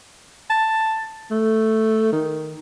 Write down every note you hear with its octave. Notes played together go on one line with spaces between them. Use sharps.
A5
A3
D#3